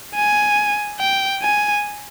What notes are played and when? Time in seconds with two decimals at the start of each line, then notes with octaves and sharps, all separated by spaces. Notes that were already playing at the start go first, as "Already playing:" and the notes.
0.15 G#5
1.00 G5
1.42 G#5